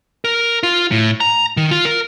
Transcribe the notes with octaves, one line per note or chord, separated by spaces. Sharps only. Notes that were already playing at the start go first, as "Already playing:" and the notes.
A#4
F4
A2
A#5
D#3
F4
A#4